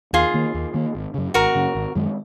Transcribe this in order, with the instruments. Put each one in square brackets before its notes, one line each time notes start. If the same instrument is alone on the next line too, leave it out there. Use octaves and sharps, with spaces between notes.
[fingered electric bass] D#2 [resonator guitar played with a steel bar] F4 G#4
[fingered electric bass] D#3 A#3
D#2
D#3 A#3
G#1
F#2 C#3
[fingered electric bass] G#1 [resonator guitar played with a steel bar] F#4 A#4
[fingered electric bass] F#2 C#3
G#1
F#2 D#3 G#3